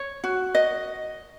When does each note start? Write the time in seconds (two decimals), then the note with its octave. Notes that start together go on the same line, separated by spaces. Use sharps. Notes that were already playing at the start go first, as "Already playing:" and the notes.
Already playing: C#5
0.24 F#4
0.55 D#5